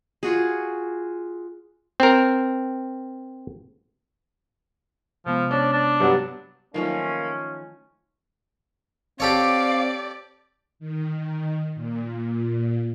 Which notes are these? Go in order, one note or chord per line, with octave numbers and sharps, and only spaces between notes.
F4 F#4 G#4
C4 A#4
C3 F3 G#3 B3
C#4 D4
D4
G2 F#3 B3 G4
D#3 F3 F#3 A3 A#3 C#4 D#4
C4 G4 A4 C#5 D5 F5
D#3
A#2